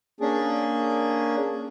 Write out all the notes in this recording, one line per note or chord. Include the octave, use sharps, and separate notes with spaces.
A#3 C#4 D4 G#4